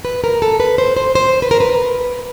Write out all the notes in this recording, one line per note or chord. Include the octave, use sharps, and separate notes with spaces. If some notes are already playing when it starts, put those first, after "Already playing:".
B4
A#4
A4
B4
C5
C5
C5
B4
A#4
B4